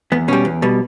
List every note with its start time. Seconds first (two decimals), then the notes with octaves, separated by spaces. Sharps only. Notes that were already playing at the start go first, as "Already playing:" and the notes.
0.12 E2 B3
0.28 B2 G3 C#4
0.45 E2
0.62 B2 G3